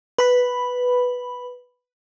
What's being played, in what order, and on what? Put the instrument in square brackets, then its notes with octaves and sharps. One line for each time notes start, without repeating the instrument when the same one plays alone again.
[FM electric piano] B4 B5